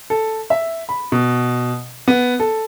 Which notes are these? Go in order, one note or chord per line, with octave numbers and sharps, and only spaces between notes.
A4
E5
B5
B2
B3
A4